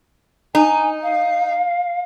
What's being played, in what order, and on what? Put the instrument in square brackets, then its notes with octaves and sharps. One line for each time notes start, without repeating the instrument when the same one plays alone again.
[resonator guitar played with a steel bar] D#4 [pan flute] G#5
[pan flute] F5